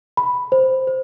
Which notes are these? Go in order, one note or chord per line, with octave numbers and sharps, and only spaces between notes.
B5
C5
C5